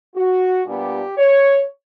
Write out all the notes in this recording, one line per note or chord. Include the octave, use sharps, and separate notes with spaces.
F#4
A#2 G3 B3 D4 G4
C#5